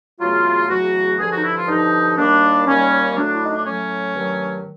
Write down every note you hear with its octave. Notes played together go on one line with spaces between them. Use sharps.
E2 C#3 F#3 A3 F4
E2 C#3 F#3 A3 F#4
G2 D3 F3 G#4
F#4
D#4
E4
F4
G2 D3 F3 D#4
D#2 D#3 G3 A#3 D4
D#2 D#3 G3 A#3 C#4
A2 F#3 A3 D4
E4
D#4
D4
A2 F#3 A3 C#4
G2 D#3 F#3 A3